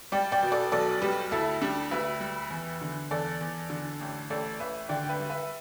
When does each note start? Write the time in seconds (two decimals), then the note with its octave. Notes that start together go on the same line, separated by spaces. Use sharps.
0.12 G3 D5 G5
0.32 D5 G5
0.43 B2
0.52 A4 D5
0.72 B1 A4 D5
1.01 G3 G4 B4
1.31 D2 E4 A4
1.61 G3 D4 G4
1.91 D2 B4 E5
2.20 G3
2.50 E2
2.81 D3
3.11 E2 A4 D5
3.41 E2
3.70 D3
4.01 A1
4.30 A1 A4 D5
4.59 A1 B4 E5
4.89 D3 D5 G5
5.04 G5
5.09 B4 E5
5.20 G3
5.30 B4 E5